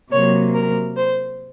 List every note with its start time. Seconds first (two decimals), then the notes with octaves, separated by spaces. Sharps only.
0.11 C3 F#3 A#3 C#5
0.54 A#4
0.96 C5